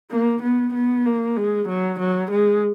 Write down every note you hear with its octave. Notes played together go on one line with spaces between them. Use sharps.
A#3
B3
B3
A#3
G#3
F#3
F#3
G#3